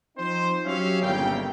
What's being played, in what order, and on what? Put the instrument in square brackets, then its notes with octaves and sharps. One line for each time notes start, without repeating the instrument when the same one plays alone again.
[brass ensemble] F3 C4 D#4 C5
F#3 C#4 G4 C#5 E5 F5
G1 A#2 C#3 E4 G5